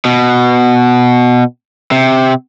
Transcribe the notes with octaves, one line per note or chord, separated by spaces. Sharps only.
B2
C3